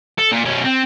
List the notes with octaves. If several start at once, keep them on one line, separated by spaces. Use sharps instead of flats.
A4
A#2
B2 C#4
C4